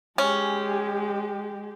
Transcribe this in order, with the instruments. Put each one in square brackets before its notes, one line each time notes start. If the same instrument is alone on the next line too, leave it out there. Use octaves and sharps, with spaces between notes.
[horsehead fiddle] G#3 G4 [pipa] C#4